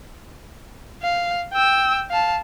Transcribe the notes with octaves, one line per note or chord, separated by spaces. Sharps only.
F5
G5 E6
F5 A5